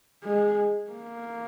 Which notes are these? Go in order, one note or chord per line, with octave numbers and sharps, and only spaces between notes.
G#3
A#3